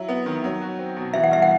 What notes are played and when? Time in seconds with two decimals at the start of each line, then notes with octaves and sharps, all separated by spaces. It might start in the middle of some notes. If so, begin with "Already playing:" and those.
Already playing: F#3 E4
0.09 B3
0.26 D#3
0.44 F#3
0.62 F#4
0.79 C4
0.97 B2
1.14 E3 E5
1.23 F#5
1.32 G2 E5
1.42 F#5